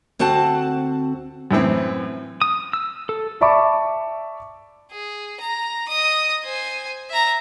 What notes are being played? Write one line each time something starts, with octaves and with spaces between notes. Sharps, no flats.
D2 C4 F#4 F#5 A5
F#2 A2 E3 C4
D#6
E6
A4
D5 E5 A5 B5 C#6 D6
G#4
A#5
D#5 D#6
C5 G#5
E5 A#5